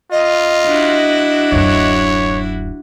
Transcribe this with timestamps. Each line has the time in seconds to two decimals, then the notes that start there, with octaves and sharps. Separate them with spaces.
0.11 F4 D#5
0.66 D4 E4 F#4
1.52 D1 F#2 C#5